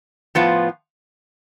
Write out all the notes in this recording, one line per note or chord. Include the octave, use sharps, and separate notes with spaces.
A2 F3 B3 F4